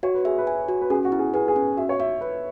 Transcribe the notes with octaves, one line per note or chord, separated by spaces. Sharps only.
F#4 C#5
B4
G#4 E5
B4
G#5
F#4
B4
C#4 G#4
F#4
E4
G#4
G#4 B4
G#4
C#4
F#4 E5
C#5
C#5 E5
B4 E5